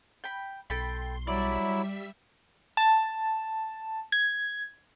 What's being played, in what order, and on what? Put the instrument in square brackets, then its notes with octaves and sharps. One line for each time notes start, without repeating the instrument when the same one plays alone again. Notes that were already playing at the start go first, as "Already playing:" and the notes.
[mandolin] G5 B5
[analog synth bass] B1 [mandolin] A4 G5 B5 [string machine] C6
[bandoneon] F#3 E4 [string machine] G3 E5 B6 [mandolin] D5
[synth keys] A5
G#6